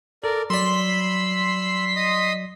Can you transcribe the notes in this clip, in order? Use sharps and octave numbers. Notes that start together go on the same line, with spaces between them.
A4 A#4 D5
F#3 D5 B5 C6 E6 B6
D#5 D#6